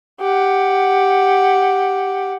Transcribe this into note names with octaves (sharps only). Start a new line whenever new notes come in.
G4 F#5